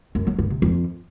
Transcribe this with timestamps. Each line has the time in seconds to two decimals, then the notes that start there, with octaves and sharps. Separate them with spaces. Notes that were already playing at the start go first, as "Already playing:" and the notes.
0.15 F#2
0.27 F#3
0.39 G2
0.50 C3
0.62 F2